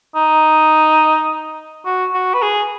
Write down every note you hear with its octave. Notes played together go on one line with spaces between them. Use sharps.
D#4
F#4
F#4
B4
G#4